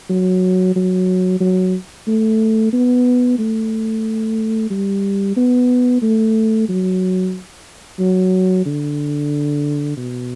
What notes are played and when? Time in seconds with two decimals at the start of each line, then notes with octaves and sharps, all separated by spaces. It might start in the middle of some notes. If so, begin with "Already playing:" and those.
0.10 F#3
0.75 F#3
1.40 F#3
2.07 A3
2.73 B3
3.38 A3
4.70 G3
5.37 B3
6.02 A3
6.69 F#3
7.99 F#3
8.66 D3
9.97 B2